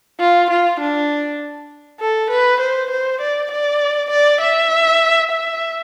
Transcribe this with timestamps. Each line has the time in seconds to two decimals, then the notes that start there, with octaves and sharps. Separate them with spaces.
0.20 F4
0.50 F4
0.80 D4
2.00 A4
2.30 B4
2.60 C5
2.90 C5
3.21 D5
3.51 D5
4.11 D5
4.41 E5
5.32 E5